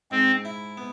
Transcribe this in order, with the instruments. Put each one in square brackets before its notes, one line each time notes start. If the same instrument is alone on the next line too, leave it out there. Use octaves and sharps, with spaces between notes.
[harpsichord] G#2 [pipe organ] C4
[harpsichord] E4
B3